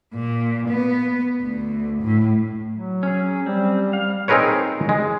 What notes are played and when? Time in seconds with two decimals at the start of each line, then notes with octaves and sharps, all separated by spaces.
0.14 A#2
0.68 B3
1.41 D2
2.02 A2
2.73 F#3
3.03 C#4 G#4
3.46 G3 C4
3.93 G3 F5
4.28 C4 D#4 G#4 A#4 B4 C#5
4.89 G#3